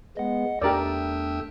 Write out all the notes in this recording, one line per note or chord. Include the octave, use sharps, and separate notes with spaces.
G#3 B3 D#5 F#5
E2 A3 D4 G4 A#4 D5 E5 G5